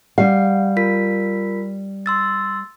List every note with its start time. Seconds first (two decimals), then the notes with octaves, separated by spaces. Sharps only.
0.18 G3 F5 F#5
0.77 F4 A#4 B6
2.06 C6 E6 A6